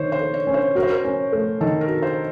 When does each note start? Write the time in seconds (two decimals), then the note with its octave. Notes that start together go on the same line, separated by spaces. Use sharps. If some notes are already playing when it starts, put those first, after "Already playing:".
Already playing: D#3 A#3 C5 C#5
0.12 C5
0.20 A4
0.34 C#5
0.47 C#4
0.54 C5
0.75 F#4 A#4
0.83 C5
0.90 A#4
1.05 C#4
1.32 A3
1.61 D#3 A4
1.81 A#4
1.88 F#4
2.02 C5